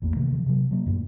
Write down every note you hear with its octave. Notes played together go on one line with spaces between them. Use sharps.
A1 E2 A2 A#3
C3 D#3 E3
D#3 F3
C3 F#3
F#3 A#3
F#2 A2 C#3